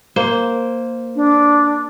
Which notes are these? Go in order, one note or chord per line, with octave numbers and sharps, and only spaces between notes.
A#3 C5
D4